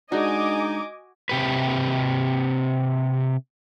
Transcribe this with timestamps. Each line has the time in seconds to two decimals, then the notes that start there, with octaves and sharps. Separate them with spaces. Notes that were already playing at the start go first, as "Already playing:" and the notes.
0.12 G#3 D4 D#4 F#4 D#5 G#5 D6
1.29 C3 G4 B4